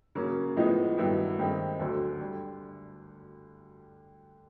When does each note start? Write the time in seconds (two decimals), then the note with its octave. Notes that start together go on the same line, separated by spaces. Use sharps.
0.15 C#3 F#3 A#3 C#4
0.56 A2 F3 G#3 B3 D#4
0.98 G2 D#3 F#3 B3 E4
1.39 G2 D#3 G#3 C4
1.80 D2 D3 F#3
2.20 D3 G3